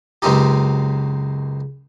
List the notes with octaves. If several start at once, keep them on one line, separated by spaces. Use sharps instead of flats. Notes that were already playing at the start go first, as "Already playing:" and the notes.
C#2 F#2 C4 C#4 D#4 G4